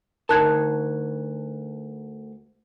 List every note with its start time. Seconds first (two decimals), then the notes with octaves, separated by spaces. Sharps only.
0.29 D2 D#4 A#4 A5 F#6 G#6